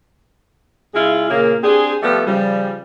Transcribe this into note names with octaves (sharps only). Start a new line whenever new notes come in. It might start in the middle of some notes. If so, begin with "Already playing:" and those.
C#3 G#3 E4 F4 G#4
A#2 C#3 A#3
C4 D4 G4 G#4
F3 G3 A3 B3 G4
C#3 F3 G3